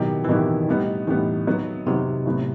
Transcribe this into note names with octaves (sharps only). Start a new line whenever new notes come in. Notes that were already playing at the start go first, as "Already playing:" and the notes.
Already playing: B2 D#3 F#3 B3 E4 G4
E3
B2 D#3 F#3 B3 E4 G4
A2 G3 B3 D#4
A2 E3 G3 B3 D#4
D#3 F#3 B3
C3 D#3 F#3 B3
A2 F#3 B3